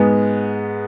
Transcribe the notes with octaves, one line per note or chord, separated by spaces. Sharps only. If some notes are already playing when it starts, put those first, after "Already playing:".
Already playing: G#2 G#3 B3